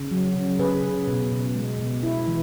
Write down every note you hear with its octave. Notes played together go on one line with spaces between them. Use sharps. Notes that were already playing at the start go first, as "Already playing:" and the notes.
Already playing: C#3
F#3
C#3
C#3 G#4 B4
C#3
B2
B2
G#3
B2
E4
E3